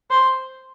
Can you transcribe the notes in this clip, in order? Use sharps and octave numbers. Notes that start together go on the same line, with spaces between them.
C5